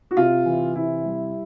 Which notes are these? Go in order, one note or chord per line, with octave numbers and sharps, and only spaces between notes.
F#4
C3 F4
E3
C3 E4
G3